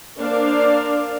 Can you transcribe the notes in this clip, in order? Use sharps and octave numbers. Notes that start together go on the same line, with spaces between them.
A#3 D4 A#4 C5 D5 F5